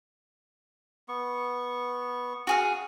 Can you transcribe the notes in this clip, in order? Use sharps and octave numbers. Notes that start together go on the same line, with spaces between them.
B3 C#6
F#4 G#4 F5